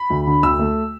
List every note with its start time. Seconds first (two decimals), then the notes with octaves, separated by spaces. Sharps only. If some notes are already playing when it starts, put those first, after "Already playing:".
Already playing: B5
0.10 D2
0.27 D3
0.43 D2 E6
0.59 A3